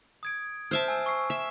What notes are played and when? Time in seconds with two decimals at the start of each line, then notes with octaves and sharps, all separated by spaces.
0.23 D#6 G#6 D7
0.71 C5 E5 A5 F6 D7
0.88 G#5 E6
1.06 C#6 E6 C7
1.30 E5 E7